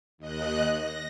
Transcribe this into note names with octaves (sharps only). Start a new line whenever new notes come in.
D#2 D#5 F#6
A#6